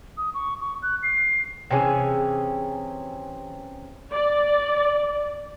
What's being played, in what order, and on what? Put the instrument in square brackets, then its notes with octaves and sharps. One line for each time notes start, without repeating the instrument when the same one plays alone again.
[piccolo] D#6
C#6
C#6
F#6
C7
[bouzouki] C3 E3 C#4 G#4
[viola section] D5